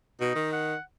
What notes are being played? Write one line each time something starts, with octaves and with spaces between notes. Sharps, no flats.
B2 D#4
D#3
F#5